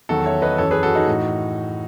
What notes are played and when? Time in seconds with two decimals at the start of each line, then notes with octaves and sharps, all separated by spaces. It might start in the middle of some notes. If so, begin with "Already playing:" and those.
0.09 E2 D#3 F#3 F#4 A4
0.26 C#5 E5
0.42 B4 D#5
0.58 F#2 E3 A4 C#5
0.71 G#4 B4
0.83 F#4 A4
0.95 D#4 F#4
1.07 A2 E3